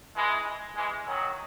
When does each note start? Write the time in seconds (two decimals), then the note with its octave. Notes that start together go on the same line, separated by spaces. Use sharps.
0.15 E3 G#3
0.76 E3 G#3
1.06 D#3 F#3